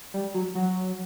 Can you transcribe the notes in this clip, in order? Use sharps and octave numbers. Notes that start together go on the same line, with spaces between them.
G3
F#3
F#3